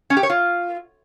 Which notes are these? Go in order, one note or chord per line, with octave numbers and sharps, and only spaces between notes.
C#4
G4
C#5
F4